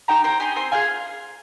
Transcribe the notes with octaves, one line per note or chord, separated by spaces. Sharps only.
D#4 G4 G5 A#5
C4 G5 A#5
D#4 G4 G#5 C6
C4 G#5 C6
F4 G#4 F5 G#5